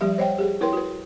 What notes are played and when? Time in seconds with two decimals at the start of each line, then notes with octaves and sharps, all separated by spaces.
0.01 F3 G3 G4 E5
0.18 C5 C#5 D#5 F#5 G5
0.38 G4 G#4
0.61 E4 A#4 B4 C#5 G5 C6
0.73 F#4 B4